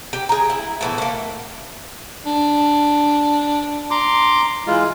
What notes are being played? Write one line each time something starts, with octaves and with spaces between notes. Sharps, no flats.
G4
G#4 A#5
E4
A2 E3 B3
A3 A#3
D4
A#5 C6 D6
E3 G#3 F4